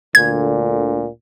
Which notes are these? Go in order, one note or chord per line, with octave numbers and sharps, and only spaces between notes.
D2 A#2 D3 G#6